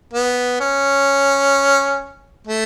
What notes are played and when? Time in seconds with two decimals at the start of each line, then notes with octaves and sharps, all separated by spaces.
0.14 B3
0.60 C#4
2.47 A3